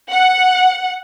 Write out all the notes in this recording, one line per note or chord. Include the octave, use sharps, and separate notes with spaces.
F#5